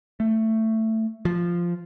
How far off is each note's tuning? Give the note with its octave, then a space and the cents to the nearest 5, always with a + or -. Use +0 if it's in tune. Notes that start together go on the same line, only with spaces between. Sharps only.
A3 +15
F3 -5